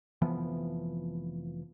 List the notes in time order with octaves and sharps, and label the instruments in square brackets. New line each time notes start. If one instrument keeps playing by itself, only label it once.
[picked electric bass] F1 E3 F3 B3